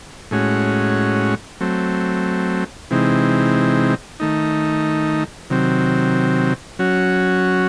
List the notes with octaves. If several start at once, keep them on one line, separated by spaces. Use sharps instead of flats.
A2 G#3 C#4 F#4
F#3 A3 C4
C3 E3 G#3 C4 D#4
D#3 A3 D#4
C3 D#3 F#3 C4
F#3 C#4 F#4